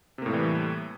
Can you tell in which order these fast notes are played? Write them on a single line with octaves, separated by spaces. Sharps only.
C3 A#3 A2 G3 E3